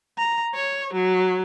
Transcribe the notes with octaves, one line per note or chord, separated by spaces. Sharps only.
A#5
C#5
F#3